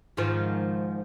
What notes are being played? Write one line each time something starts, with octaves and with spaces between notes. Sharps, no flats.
G#2 D#3 F3